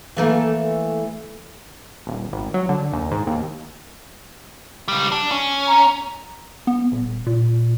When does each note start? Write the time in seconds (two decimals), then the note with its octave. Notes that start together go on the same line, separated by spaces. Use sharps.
0.17 E3 A3 A#3
2.07 D#1
2.33 G#1
2.54 F#3
2.69 D3
2.93 D#2
3.11 G#2
3.27 D#2
4.88 C#2 G3
5.12 D4
5.31 C#4
5.68 A#5
6.67 B3
6.92 D#1
7.26 A#2